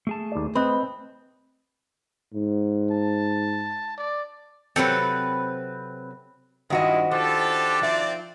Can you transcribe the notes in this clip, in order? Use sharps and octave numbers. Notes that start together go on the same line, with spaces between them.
A3 G#4 A5
D#2 D5
C4 B4 D#5
G#2
A5
D5
C3 F#3 C4 A4 B4
G2 D#3 F3 G#3 D4 E4 F#4 D#5
F3 D4 F4 G4 A4
F3 C4 D#4 D5 E5